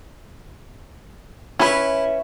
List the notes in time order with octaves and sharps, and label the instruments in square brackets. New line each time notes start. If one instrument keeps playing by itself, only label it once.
[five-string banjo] C#4 B4 [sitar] E4